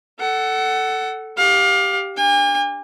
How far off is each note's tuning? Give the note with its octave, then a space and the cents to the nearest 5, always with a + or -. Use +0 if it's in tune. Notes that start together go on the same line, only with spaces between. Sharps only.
A4 +0 F#5 +20
G4 +0 F5 +25
D4 -5 G#5 -45